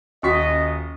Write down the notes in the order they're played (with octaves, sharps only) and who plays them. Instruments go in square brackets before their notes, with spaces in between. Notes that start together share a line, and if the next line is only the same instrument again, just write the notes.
[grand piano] D#1 C#6 B6 [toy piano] C#4 F#4 F#5 [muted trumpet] D#5